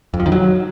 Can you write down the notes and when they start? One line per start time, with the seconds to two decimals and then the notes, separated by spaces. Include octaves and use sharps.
0.14 F2
0.20 F3
0.26 D#3
0.32 F#3